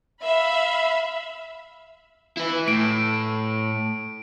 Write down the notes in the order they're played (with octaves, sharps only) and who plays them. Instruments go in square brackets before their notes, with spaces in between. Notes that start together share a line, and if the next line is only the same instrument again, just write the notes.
[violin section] E5 F5 B5
[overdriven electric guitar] E4 B4
[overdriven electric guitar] A2 [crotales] D7